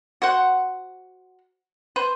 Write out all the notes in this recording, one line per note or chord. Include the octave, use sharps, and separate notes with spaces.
F#4 C5 F#5
B4 C5